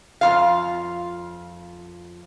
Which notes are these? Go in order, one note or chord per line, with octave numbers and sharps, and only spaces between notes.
F2 F4 F5